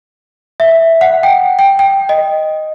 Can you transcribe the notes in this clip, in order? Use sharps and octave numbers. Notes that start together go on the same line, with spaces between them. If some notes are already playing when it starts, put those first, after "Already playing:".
E5
F#5
G5
G5
G5
D#5